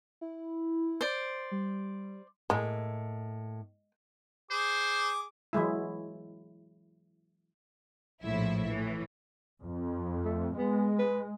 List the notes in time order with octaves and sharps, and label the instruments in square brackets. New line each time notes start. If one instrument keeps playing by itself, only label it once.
[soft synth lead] E4
[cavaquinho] C5 D5
[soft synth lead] G3
[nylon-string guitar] A2 A#3 [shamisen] G#3
[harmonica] G#4 D6 [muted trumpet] C5
[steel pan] E3 F#3 G#3 E4
[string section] A#1 A2 F3 E4 E5
A2 E3
[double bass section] F2
[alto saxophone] A3
[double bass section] G#3 [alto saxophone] B3
[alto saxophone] B4